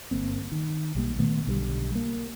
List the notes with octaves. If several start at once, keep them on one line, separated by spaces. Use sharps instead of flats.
G1 A#3 C4
D#3
B1 G3 A#3
A#2 D#3 A3 B3
B1 D3 F#3 G3
A#3